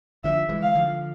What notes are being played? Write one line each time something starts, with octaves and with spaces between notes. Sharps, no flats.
D3 F3 E5
E3 G#3
F5
D3 F3